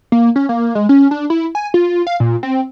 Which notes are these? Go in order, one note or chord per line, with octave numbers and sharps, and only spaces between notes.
A#3
C#4
A#3
G#3
C#4
D4
E4
G#5
F4
F5
A#2
C4